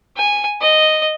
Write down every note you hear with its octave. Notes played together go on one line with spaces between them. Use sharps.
G#5
D#5